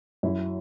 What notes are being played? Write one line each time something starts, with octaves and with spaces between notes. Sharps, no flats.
F#2 F#3 E4